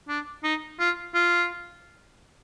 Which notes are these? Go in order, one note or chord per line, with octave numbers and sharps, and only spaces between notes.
D4
D#4
F4
F4